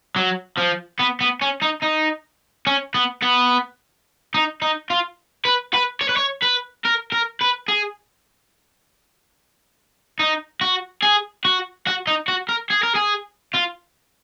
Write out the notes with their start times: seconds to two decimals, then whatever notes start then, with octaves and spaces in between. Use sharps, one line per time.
0.16 F#3
0.57 F3
0.99 B3
1.21 B3
1.42 C#4
1.62 D#4
1.83 D#4
2.67 C#4
2.94 B3
3.23 B3
4.34 D#4
4.62 D#4
4.90 F4
5.45 B4
5.74 B4
6.01 C#5
6.09 B4
6.17 C#5
6.43 B4
6.85 A#4
7.12 A#4
7.41 B4
7.68 G#4
10.20 D#4
10.61 F#4
11.02 G#4
11.45 F#4
11.87 F#4
12.07 D#4
12.28 F#4
12.49 A#4
12.71 G#4
12.83 A#4
12.95 G#4
13.55 F4